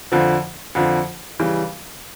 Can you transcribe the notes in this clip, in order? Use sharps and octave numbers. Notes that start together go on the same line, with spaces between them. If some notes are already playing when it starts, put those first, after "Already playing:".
F2 D3 F3
F2 D3 F3
C#3 E3 G3